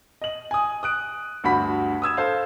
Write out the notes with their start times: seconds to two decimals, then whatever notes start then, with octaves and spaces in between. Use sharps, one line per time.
0.22 D#5 F#7
0.51 G#5 D#6
0.83 D#6 F#6 D7
1.44 D2 G2 F#4 B5 B6
2.02 D#6 E6 G#6 E7
2.17 A4 C5 F5